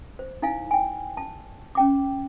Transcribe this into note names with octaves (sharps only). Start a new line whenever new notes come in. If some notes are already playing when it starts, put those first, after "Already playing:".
C5
D#4 E4 F5 G#5
G5 G#5
A5
C#4 G5 D6